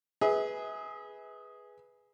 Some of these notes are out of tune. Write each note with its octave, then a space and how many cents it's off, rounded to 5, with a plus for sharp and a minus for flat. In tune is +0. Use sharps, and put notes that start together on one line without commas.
G#4 +0 B4 +0 E5 -40